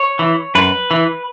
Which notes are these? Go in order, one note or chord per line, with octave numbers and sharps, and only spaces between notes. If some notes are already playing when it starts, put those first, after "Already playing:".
Already playing: C#5
E3
F#2 B4
E3